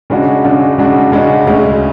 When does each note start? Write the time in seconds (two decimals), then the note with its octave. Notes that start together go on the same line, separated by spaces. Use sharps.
0.10 C#3 G#3 D4 F#4
0.44 C#3 G#3 D4 F#4
0.78 C#3 G#3 D4 F#4
1.12 C#3 G#3 D4 F#4
1.47 D2 C#3 G#3 C#4